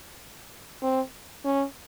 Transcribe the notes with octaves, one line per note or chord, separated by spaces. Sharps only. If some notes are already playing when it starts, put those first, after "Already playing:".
C4
C#4